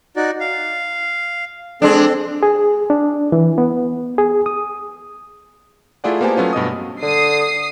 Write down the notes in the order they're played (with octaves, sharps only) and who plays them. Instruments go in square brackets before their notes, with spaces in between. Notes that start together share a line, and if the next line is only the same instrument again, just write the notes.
[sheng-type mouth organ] D#4 F#4 D5
F5
[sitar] G#3 D4 [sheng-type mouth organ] C4 A4
[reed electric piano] G#4
D4
E3
B3
G#4
D#6
[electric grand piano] A3 E4 F4 G#4 D5 F#5
A#3 B3 G4 C5 G#5 A5
F#3 A3 B3 C#4 F4
G2 B2 D#5 D#6
[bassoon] D3 [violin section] D#6 C7